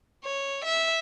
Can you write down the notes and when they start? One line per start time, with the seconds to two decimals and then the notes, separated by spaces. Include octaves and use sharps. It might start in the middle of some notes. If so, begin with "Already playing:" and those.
0.24 C#5
0.65 E5